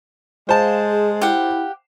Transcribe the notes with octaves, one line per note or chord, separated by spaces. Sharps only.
G#3 C5 F5 A5
G#4
E4 G4 F5 F#5